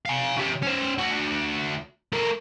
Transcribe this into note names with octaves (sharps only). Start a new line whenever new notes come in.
F5 G#5
C#3 G4
C#4 C5
D2 F#4
A3 A#4